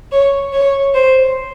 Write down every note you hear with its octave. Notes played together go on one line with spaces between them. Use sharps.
C#5
C#5
C5